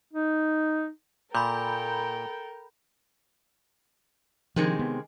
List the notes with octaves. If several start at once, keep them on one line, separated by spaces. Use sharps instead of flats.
D#4
A#2 A4 A#4 G5 B5 G6
C3 D#3 F3 G#3
B3